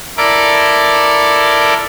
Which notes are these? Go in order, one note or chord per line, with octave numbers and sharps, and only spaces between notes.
E4 A4 A#4 D5 D6